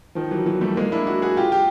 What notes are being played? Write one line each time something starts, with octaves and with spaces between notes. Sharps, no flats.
D#3 F3
E3 F#3
E3 F#3
G3 A3
G#3 A#3
D4 E4
E4 F#4
F#4 G#4
F4 G4
F4 G4